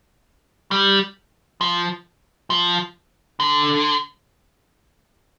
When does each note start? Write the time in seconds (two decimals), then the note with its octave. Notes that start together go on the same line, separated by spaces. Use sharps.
0.71 G3
1.61 F3
2.50 F3
3.40 D3